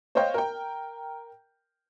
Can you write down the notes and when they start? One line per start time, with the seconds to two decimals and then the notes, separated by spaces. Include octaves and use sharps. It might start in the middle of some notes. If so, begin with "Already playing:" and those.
0.15 C5 C#5 D#5 F5 G5 G6
0.34 A#4 G5